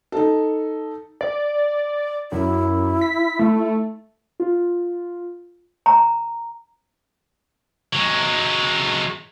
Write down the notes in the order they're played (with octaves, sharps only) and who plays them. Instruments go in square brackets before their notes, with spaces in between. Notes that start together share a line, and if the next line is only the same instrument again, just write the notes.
[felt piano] D#4 A4
[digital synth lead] D5
[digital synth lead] F#2 [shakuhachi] E4
[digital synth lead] B6
A3
[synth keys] F4
[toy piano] A#5
[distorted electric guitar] F#3 G#3